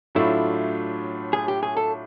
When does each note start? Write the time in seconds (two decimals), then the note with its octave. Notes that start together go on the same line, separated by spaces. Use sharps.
0.15 A2 F#3 A3 D4 E4 F4
1.33 G#4
1.48 G4
1.63 G#4
1.77 A4